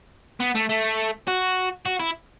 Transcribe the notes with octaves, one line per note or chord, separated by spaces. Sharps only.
B3
A3
A3
F#4
F#4
E4